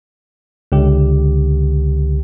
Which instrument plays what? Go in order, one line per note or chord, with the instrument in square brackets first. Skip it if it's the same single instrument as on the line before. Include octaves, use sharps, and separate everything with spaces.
[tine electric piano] C#2 D3 G4